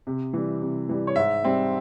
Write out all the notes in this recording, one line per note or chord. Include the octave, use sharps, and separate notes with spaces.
C3
E3 G3
C3
E3 G3
C#5
G#2 E5
G3 C4